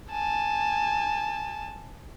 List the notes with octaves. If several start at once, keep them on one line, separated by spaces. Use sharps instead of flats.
G#5 A5